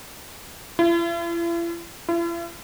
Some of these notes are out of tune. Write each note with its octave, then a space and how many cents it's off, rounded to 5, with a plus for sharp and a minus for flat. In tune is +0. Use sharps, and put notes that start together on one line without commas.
E4 +45
E4 +45